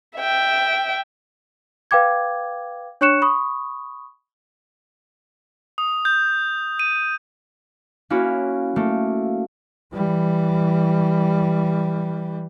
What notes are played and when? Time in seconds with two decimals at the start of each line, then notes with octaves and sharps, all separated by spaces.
0.17 E5 G5
1.91 B4 F5 G5 D6 G#6
3.01 D4 C#5 C#6 F#6 C#7 E7
3.22 B5 C#6 D#6
5.78 D#6
6.05 G6
6.79 D#7
8.10 A#3 C#4 E4 F#4
8.76 A3 A#3
9.93 E3 G3